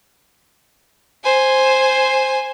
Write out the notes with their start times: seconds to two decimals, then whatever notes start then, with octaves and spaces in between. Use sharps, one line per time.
1.24 C5 G#5